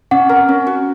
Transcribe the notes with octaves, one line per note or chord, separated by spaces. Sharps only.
C#4 F#5
A#4
C#4
F#4